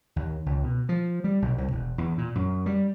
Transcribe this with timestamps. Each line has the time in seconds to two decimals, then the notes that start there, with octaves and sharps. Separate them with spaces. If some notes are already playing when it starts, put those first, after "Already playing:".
0.16 D#2
0.46 C#2
0.64 B2
0.89 F3
1.24 G3
1.42 B1
1.58 C2
1.72 E1
1.98 E2
2.18 A#2
2.35 F#2
2.66 G3